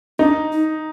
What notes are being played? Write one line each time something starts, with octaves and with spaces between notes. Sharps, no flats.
D4 D#4
D#4